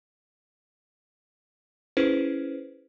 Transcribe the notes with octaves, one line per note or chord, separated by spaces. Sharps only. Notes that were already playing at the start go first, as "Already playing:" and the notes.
C#4 E4 G#4 B4 C5